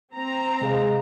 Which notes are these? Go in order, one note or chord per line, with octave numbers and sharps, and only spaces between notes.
C4 A#5
C3 G#3 G#4 F5